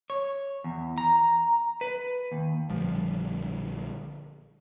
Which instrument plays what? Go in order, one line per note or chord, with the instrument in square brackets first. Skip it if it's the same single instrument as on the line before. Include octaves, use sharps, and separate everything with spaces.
[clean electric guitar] C#5
E2
A#5
B4
D#2
[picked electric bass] A#1 D3 F3 G3